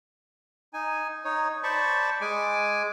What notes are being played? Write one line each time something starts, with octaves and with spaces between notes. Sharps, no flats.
D#4 G#5
D#4 C#5
C5 D5 A5 B5 C#6
G#3 G#5 D6